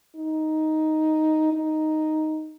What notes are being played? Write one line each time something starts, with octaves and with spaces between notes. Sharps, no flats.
D#4
D#4